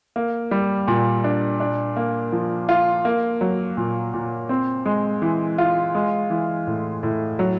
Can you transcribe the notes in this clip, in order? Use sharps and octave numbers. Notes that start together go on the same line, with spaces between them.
A#3
G3
A#2
D4
D4
A#3
F3
F4
A#3
F#3
A#2
A#2
C4
G#3
E3
F4
G#3
E3
A2
A2
F#3